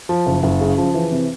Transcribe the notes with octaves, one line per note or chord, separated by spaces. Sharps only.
F3
F#1
F#1
C#3
F3
E3
C3